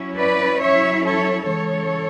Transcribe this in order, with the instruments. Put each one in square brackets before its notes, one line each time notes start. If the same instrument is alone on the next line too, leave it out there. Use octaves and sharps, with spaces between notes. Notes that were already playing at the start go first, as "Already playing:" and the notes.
Already playing: [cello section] F#3 C#4 E4
B4 D5
F#3 C#4 E4 C#5 E5
A4 C#5
C#3 E3 G#3 A4 C#5